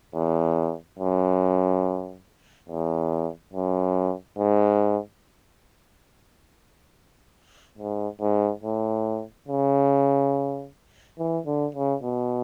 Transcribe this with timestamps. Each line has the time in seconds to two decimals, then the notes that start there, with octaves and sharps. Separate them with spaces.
0.14 E2
0.99 F#2
2.69 E2
3.53 F#2
4.38 G#2
7.78 G#2
8.21 G#2
8.63 A2
9.48 C#3
11.19 E3
11.46 D3
11.75 C#3
12.03 B2